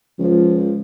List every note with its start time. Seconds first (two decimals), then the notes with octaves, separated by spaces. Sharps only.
0.19 C#2 F3